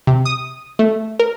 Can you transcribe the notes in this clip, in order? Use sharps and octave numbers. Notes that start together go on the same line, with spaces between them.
C3
D#6
A3
A#4